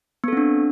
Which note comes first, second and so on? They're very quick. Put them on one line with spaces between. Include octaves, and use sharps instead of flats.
B3 A4 C4 D4